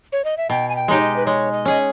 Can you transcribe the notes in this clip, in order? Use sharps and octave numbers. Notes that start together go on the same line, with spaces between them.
C#5
D#5
E5
B2 G5
G#5
G5
G#3 D#4 G4 C#5
D#5
B4
G#3 C#5
D#5
C#4 G#4 D#5